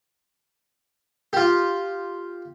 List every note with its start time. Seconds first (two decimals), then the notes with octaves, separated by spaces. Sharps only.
1.33 F4 G4